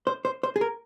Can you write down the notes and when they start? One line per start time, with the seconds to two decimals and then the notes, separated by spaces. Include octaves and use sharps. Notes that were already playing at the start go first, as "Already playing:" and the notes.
0.07 C5
0.25 C5
0.43 C5
0.56 G#4
0.61 A#4